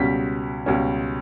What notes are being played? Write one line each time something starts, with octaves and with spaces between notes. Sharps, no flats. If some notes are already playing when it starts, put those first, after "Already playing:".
Already playing: C#2 B2 G3 C#4 B6
C#2 B2 G3 C#4